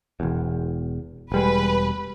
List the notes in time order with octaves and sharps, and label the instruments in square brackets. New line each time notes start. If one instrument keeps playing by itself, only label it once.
[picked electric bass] E1 E2
[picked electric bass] E1 G3 G#3 [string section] B4